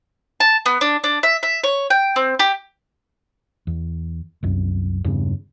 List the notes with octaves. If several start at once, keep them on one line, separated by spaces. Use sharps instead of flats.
A5
B3
D4
D4
E5
E5
C#5
G5
C4
G4
E2
C2 F#2
E2 G2 C#3